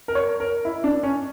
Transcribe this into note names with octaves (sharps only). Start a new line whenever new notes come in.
A#4
C#5
A#4
E4
D4
C#4